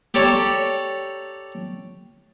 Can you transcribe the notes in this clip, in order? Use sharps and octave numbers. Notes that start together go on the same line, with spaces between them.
G4 A4 C#5 D5 A#5 C#6